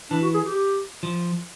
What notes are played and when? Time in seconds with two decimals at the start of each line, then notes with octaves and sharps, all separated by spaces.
0.10 E3 D4
0.22 F#4
0.34 G#4
0.46 G4
1.03 F3